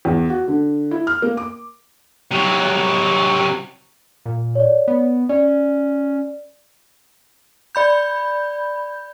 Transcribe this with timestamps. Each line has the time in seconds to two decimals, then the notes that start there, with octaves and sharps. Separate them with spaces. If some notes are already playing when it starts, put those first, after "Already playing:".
0.05 E2
0.30 F#4
0.48 D3
0.91 E4
1.07 F6
1.22 A#3
1.37 D6
2.31 C3 F#3
4.26 A#2
4.55 C#5 D5
4.88 B3
5.29 C#4 D5
7.75 D5 B5 G6